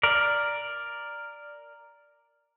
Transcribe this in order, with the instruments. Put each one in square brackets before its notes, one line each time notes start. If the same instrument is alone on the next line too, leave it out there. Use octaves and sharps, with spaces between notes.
[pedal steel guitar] A#4 D5